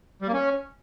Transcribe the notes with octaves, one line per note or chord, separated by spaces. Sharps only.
G3
A#3
C#4